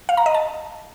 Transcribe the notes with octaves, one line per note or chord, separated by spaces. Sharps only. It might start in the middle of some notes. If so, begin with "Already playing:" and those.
F5
A#5
D#5
A5